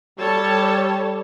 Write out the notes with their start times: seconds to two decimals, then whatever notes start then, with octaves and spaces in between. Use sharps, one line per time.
0.19 G3 A4 C#5 A5